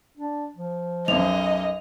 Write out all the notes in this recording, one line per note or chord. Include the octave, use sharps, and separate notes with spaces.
D4
F3
B1 F#2 D#5 F7